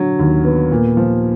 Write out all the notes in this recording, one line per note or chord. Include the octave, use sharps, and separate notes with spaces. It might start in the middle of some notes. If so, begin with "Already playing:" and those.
Already playing: D3 F#3
D#2
B3
A#2
F3